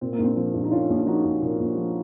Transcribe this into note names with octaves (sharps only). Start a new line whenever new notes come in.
A#2 C4
A#3
A#1
C4
F3 C4
A#1
D#4
A#2 C#4 F4
A#1
F3 D#4 F#4
A#1
A#2
A#1
F3